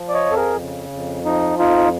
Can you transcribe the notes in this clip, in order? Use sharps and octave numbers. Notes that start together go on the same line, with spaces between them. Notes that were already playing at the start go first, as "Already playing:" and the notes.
Already playing: F3
D5
C#5 D#5
F2
A4
G#4 A#4
C#3
F2
F3 D#4
F2 D#4 F4